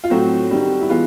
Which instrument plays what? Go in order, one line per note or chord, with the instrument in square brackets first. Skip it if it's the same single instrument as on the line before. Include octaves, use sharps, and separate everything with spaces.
[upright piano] F4
A2 F#3 A3 C4 F#4
D#3 G3 C4
E4
E3 G#3 B3 F4